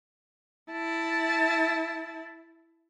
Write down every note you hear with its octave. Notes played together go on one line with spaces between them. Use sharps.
E4 A5